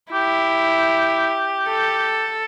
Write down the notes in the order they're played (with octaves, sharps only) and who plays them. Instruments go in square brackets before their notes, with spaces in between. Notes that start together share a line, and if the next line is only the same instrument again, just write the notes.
[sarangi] E4 [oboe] G4
[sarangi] A4